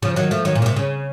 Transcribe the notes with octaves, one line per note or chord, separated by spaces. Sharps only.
C#3 F3
D#3 F#3
F3 A3
D#3 F#3
A#2
C#3
C3
C#3